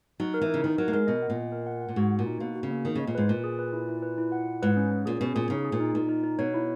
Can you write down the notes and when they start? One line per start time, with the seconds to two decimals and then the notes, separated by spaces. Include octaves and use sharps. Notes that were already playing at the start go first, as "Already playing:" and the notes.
0.20 F#3 D#4
0.34 A#4
0.41 E3
0.49 C#3 D#4
0.64 D#3 D#4
0.78 F#3 A#4
0.88 A#3
0.93 G#3 A#4
1.07 B2 D#5
1.22 F#5
1.30 A#2
1.37 D#5
1.52 A#4
1.67 F#5
1.81 F#5
1.89 A#2
1.96 G#2 F#4
2.11 F#4
2.19 A#2
2.26 D#4
2.40 B2 A#3
2.55 F#4
2.63 C#3
2.71 A#3
2.85 D#3 G#4
2.95 C#3 D#5
3.07 A#2
3.15 G#2 B4
3.29 A#2 B4
3.44 G#4
3.59 B4
3.73 E4
3.89 E4
4.02 B4
4.18 E4
4.32 F#5
4.47 E4
4.62 G#2 B4
4.77 C#4
4.91 C#4
5.06 A#2 G#4
5.21 B2 C#4
5.35 A#2 G#4
5.50 C#3 D#4
5.65 G#4
5.72 A#2
5.80 D#4
5.95 A#2 D#4
6.09 D#4
6.24 D#4
6.39 B2 C#5
6.54 E4